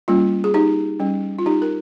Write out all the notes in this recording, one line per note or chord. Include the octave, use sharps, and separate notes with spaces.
G3 A#3 C#4 F4
G#4
D#4 G4
G3 C#4
F4
D#4 G4
A#4